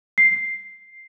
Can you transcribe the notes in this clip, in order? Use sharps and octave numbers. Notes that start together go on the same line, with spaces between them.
C7